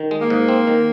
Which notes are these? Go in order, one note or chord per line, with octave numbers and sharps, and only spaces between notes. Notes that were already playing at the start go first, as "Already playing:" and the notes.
Already playing: D#3
G#3
A#3
G#2
C4
D#3